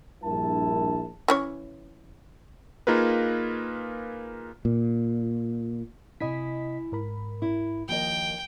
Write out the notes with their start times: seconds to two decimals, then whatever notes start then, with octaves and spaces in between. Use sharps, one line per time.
0.24 A#1 G2 E4 A#4 A5
1.28 E3 C#4 C#5
2.87 A#3 D#4 F4 G#4 A#4 B4
4.65 A#2
6.20 C3 E4 D#5 G#5 B6
6.92 G#2 A#4 B5
7.42 E4
7.89 D#2 F3 A#4 D#5 G5